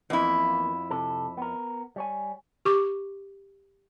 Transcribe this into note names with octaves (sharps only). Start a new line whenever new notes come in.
F2 E3 A#3 B3 E4
C3 A4
B3 A#4
G3 C#5 G#5
G4 C#6 D6